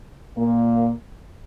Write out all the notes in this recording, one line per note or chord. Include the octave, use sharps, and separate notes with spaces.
A#2 A#3